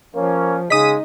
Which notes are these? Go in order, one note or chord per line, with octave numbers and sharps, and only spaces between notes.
F3 A#3 C#4
C#3 G#3 D#4 D#5 D#6 B6